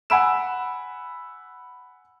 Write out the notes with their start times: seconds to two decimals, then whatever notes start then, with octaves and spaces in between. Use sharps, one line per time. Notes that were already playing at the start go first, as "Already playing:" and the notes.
0.10 F#5 G#5 B5 E6 D7 E7